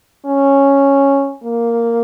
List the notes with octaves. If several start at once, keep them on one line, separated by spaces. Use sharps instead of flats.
C#4
A#3